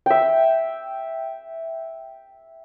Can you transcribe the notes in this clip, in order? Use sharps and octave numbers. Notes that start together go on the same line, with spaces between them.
E5 G5